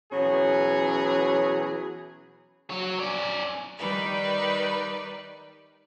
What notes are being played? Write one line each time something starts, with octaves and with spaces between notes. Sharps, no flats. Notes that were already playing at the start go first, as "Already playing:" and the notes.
B2 E3 F#3 C#4 G#4
F#3 C#5
C#4 D5
D#3 G3 D#4 B4 D5